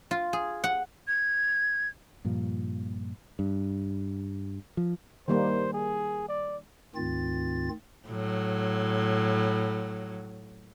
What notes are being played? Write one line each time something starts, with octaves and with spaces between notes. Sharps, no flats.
F4
G#4
F#5
G#6
G2 A#2 F3
G2
F3
D#3 G3 A#3 C5
G#4
D5
D2 G#2 D#3 C4 F4 A6
A2 F#3